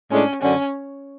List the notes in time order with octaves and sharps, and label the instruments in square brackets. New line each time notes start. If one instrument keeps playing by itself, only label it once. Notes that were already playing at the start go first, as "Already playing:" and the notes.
[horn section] A2 G#3 D4 [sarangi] C#4
[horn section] F#2 D3 [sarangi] C#4